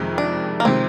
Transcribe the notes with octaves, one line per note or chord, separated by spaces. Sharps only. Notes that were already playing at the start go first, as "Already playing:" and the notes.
Already playing: F2 C3 D#3 G#3
D4
A#3
C3 D#3 G#3 C4